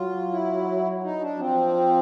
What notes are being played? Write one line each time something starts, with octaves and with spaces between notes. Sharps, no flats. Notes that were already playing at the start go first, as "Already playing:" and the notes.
Already playing: F#3 F4
E4
D#4
D4
F3 C4